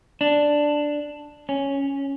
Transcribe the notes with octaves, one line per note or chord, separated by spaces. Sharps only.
D4
C#4